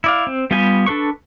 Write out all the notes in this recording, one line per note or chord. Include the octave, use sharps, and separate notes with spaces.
E4 D5 F5
C4
G3 B3 F4 G4 G#5
D4 A4 B4 C#6